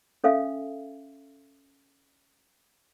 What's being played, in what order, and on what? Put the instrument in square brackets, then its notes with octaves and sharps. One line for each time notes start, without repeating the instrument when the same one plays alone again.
[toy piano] C#4 A4 E5 F5 G#5